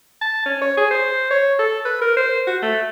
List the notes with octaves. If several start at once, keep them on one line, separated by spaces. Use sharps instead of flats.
A5
C#4
C#5
G#4
C5
C#5
A4
B4
A#4
C5
F#4
A3